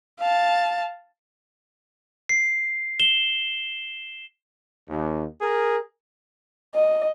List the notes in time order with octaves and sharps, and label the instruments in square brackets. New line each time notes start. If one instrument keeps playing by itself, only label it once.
[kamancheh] F5 A5
[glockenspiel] C7
E7 G7
[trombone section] D#2
G#4 A#4
[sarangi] D#5